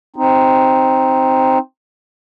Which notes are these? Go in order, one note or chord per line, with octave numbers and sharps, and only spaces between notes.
C4 D#4